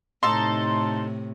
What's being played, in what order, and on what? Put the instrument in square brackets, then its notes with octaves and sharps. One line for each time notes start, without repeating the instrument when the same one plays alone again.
[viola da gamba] A2 C3 [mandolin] D#4 A4 [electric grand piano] C6